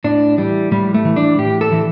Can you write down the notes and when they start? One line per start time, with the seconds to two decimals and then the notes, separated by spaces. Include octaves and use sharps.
0.04 A2 D4
0.38 E3 G3
0.72 A2 G3
0.94 A3
1.05 E3
1.16 D4
1.38 A2 G4
1.61 A4
1.72 E3